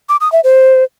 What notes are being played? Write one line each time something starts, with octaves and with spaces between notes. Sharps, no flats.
D6
D#6
E5
C5